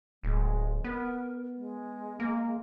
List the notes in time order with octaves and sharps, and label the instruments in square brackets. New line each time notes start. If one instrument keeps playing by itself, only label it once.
[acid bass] D1 [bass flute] G#3
[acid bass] B3 [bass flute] A#4
[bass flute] G#3
[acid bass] A#3